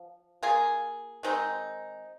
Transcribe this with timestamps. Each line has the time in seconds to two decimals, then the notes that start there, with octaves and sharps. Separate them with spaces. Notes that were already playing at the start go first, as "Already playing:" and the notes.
Already playing: F3
0.43 A#3 F4 G#4
1.23 D#3 G#3 C4 D#4